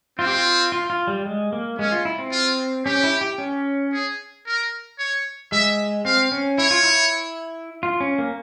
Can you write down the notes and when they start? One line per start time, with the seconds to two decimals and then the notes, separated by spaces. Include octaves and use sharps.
0.19 C4 F4
0.27 G4
0.35 F4
0.72 F4
0.90 F4
1.07 G3
1.26 G#3
1.53 A#3
1.79 G#3 C#4
1.92 F4
2.05 E4
2.18 C4
2.31 F4
2.85 C#4 G4
3.04 E4
3.21 G4
3.38 C#4
3.92 G#4
4.46 A#4
4.99 C#5
5.52 G#3 E5
6.05 C4 F5
6.32 C#4
6.58 E4 C#5
6.71 F4
6.83 E4
7.83 F4
8.00 C#4
8.19 A#3